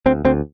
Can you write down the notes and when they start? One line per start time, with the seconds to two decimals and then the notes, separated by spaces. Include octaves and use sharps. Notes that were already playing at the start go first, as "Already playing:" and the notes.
0.06 D2 C4
0.25 D2 C4